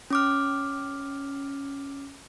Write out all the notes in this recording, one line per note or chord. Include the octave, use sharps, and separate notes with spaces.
C#4 D6 F6